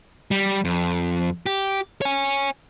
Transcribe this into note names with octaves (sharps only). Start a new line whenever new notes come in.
G3
F2
G4
C#5 G#5